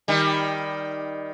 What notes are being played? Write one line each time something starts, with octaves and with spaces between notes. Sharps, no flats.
D#3 G3